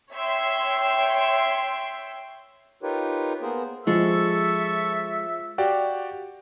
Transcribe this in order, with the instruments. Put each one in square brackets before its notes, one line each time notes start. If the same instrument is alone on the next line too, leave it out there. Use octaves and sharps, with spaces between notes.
[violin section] C#5 E5 G5 C6 C7
[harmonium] D#4 F4 G4 A#4 B4 C#5
A#3 B3 G#4 A#4 C5
[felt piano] F3 [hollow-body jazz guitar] G#3 [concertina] A4 C#6 [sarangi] E5
[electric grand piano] F#4 G4 D5 F5 G5